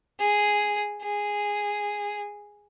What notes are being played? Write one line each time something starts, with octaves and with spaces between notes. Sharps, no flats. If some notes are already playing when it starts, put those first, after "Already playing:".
G#4
G#4